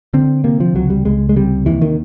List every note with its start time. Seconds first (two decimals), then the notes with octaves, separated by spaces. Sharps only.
0.14 D3 C4
0.44 C3 A#3
0.60 F3
0.74 C#2 F#3
0.90 G3
1.05 C#2 G#3
1.29 G#3
1.36 C3 G3
1.66 D#2 E3
1.82 D#3